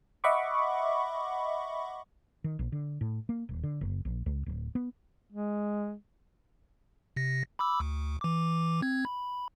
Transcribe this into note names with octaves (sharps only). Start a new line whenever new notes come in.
D#5 E5 F#5 B5 C#6 D6
D#3
A#1
D3
A2
A#3
D#1
D3
F#1
A#1
C#2
D1
B3
G#3
C3 A#6
B5 D6 E6
D2
E3 D6
C4 G#6
B5